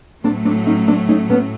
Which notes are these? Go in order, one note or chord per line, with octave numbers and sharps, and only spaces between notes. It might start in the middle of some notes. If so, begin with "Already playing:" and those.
A2 F#3 A3 C4 D4
C4 D4
C#4 D#4
C4 D4
C#4 D#4
B3 C#4